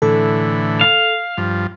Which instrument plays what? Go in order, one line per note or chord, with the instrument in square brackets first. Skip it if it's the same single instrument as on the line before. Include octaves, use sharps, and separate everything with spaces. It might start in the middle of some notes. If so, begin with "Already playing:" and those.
[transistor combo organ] A2 D3 E3 [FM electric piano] A4
[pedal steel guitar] F5
[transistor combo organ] G2 F3